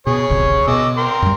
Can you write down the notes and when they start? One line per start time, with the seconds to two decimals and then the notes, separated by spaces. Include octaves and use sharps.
0.07 B2 G#4 C#5
0.30 D1 G#1 C3
0.68 B2 D#5 D6 E6
0.97 A#4 G5 C6
1.22 F#2 G3